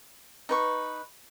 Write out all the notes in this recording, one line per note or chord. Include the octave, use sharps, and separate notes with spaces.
D#4 B4 C#6